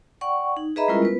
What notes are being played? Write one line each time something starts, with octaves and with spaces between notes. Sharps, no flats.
D5 F#5 G5 C#6
D#4
G#4 B4 D#5 E5 A#5 B5
G3 G#3 C#4 E4 F4 A#4
B3 B4